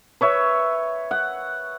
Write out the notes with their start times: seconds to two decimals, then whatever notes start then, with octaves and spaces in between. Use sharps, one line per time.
0.21 B4 C#5 E5
1.11 F#5